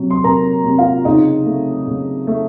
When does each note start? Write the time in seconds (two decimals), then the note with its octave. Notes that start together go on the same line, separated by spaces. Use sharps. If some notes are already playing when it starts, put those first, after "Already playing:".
Already playing: C3 F#3
0.10 C6
0.24 C3 A#4 A#5
0.64 C3
0.78 F4 F5
1.05 C#3 D#4 D#5
1.45 A3
1.87 C#3
2.27 A3